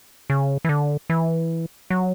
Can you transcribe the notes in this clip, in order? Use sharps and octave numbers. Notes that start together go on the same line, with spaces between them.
C#3
E3
D3
E3
F#3